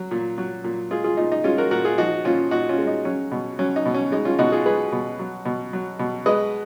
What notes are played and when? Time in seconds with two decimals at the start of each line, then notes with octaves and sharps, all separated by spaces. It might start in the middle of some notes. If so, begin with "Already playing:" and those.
Already playing: F#3
0.11 A#2
0.38 F#3
0.64 A#2
0.91 G#3 F4 G#4
1.04 F4 G#4
1.17 A#2 D#4
1.32 D#4
1.44 G#3 C#4 F4
1.58 F#4 A#4
1.71 A#2 F#4 A#4
1.85 F4 G#4
1.98 F3 D#4 F#4
2.25 A#2 C#4 F4
2.51 A#2 D#4 F#4
2.69 C#4 F4
2.78 G#3
2.87 D#4
3.05 F#3 C#4
3.31 B2
3.59 F#3 C#4
3.76 D#4
3.85 B2
3.94 C#4
4.12 G#3 D#4
4.25 C#4 F4
4.39 B2 D#4 F#4
4.52 F4 G#4
4.66 G#3 G#4 B4
4.92 B2
5.19 F#3
5.45 B2
5.73 F#3
5.99 B2
6.26 G#3 B4 D#5